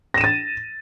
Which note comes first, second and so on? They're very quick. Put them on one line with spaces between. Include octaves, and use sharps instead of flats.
A#6 E7 D#7 A6